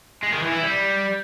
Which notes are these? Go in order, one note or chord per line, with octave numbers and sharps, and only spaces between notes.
G#3
D#3
E3
E4
G3